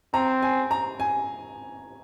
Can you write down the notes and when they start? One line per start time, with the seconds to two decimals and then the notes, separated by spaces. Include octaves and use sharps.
0.14 C4 A#5
0.42 G#5
0.71 A#5
1.00 G#5